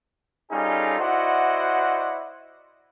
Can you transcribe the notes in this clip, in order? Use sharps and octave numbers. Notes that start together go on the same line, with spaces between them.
G3 C#4 D#4 F4 G#4 A4
E4 F#4 C5 D5 D#5 F#5